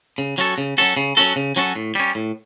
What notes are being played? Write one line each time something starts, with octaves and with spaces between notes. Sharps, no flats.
C#3
F#3 C#4 F#4 A4
C#3
F#3 C#4 F#4 A4
C#3
F#3 C#4 F#4 A4
C#3
F#3 C#4 F#4 A4
A2
G3 C#4
A2